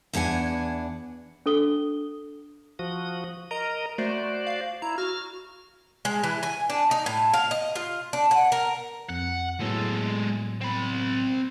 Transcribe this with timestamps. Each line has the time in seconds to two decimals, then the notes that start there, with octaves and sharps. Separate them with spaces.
0.13 E2 E3 D4 F#5 G#5
1.46 D4 A4 D#6 G7
2.79 F3 F#4 D#6
3.51 A#4 D#5 A#5
3.98 A3 F#4 C5 D5
4.47 F5
4.82 E4 A#5
4.98 F#4 F6
6.05 G#3
6.24 E3
6.43 G#5
6.70 D4
6.91 D#4
7.06 A2
7.34 F5
7.51 D#5
7.76 F4
8.13 D4
8.31 F#5
8.52 A#4
9.10 F2 F#5
9.61 A2 F#3 G#3 B3 A4
10.61 C4 B5